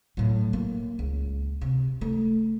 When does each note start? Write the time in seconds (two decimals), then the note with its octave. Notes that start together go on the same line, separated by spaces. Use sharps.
0.17 A2 F#3
0.53 A#3
0.99 C#2
1.61 C3
2.01 A3